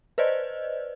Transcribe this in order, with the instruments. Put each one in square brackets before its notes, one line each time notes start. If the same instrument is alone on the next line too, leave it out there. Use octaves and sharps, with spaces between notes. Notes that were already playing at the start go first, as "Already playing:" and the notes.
[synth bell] B4 C5 D5 D#5